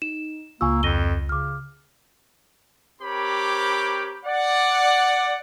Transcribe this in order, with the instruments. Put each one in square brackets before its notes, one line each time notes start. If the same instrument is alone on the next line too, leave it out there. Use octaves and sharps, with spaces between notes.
[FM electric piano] D#4 [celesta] E7
[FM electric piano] C#2 F4 [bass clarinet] A#3 [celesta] G#5 C#6 E6
[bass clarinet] F2 [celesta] A#6 D#7 G7
[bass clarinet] C#3 [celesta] D6 F6
[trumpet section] C4 G4 A#4 C#5 B5 D6
D5 F#5